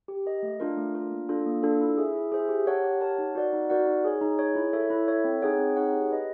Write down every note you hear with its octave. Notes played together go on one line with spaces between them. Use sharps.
G4
A#4 D#5
A3
D4 F4 A#4
A3
D4 F4 A#4
A#3
D4 F4 A4
A#3
D4 F4 A4
E4
G#4 C5 E5
E4
G#4 C5 E5
G4
A#4 C#5 F#5 A5
G4
A#4 C#5 F#5 A5
D#4
F#4 A#4 D5 F#5
D#4
F#4 A#4 D5 F#5
D#4
G#4 C#5
D#4
G#4 C#5
E4
A4 C#5 E5
E4
A4 C#5 E5
C4
D#4 G#4 C#5 F#5
C4
D#4 G#4 C#5 F#5
G4
B4 D#5